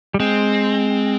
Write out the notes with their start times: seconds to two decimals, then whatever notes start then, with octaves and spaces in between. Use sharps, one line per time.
0.14 G3
0.20 G#3 C4